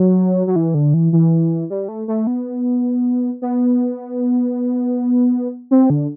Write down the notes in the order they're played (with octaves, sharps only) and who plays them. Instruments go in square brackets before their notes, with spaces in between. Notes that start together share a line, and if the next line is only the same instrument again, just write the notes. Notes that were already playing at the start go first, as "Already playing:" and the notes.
Already playing: [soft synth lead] F#3
F#3
E3
D3
E3
E3
G3
A3
A3
B3
B3
C4
D3